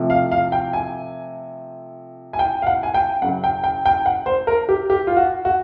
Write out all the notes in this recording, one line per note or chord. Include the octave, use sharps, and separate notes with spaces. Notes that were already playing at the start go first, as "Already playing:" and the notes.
Already playing: C3 F3 A3
F5
F5
G5
G#5
G#5
G5
F5
F#5
G#5
G5
F#2 C#3 F#3 F#5
G5
G5
G5
F#5
C5
A#4
G4
G4
F4
F#4
F#4